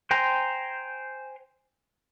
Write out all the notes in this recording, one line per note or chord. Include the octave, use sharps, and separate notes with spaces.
C5 G5 G#5 A#5 C6